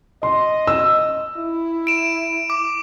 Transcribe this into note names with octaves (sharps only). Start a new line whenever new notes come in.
D#5 C6
E6
E4
D7 E7
D6